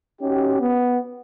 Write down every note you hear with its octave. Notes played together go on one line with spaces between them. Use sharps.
C#4 D#4 F#4 G4
B3